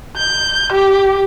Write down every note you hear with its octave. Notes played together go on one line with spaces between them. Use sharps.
G6
G4